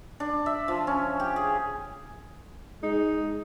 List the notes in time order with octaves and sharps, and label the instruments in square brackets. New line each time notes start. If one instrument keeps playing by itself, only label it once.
[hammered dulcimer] D4
E5
F3
C#4
G4
G#4
[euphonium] G#3 [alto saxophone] D#4